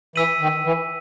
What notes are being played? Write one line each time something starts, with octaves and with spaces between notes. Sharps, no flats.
E3 E6 B6 D#7 F#7
D#3
E3